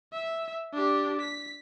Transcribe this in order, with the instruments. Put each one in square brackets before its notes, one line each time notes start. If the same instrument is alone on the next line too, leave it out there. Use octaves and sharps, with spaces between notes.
[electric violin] E5
D4 G4
B6